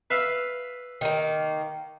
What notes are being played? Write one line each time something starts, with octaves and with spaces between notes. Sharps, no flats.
B4 E5 F5
D#3 A#3